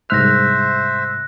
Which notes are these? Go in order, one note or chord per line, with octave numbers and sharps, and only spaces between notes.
C2 G#2 C5 E5 F6 F#6 A#6